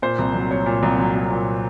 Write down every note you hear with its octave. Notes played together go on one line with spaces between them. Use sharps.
A#2 C5
C2
F#3
C2 C#5
A#2
C2
F#3
C2
A#2